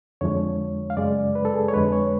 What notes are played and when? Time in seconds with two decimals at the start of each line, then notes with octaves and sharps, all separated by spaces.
0.21 F2 D3 F3 G#3 C#5
0.90 F5
0.97 F#2 C#3 G#3 D5
1.35 B4
1.45 A4
1.54 G#4
1.68 C#5
1.73 F2 D3 G#3 B4
1.92 C#5